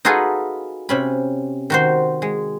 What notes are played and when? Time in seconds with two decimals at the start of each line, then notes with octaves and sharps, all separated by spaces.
0.05 D#4 F4 F#4 G#4 A4 B4
0.89 C3 C#4 B5
1.70 D#3 F#4 C5
2.22 G#3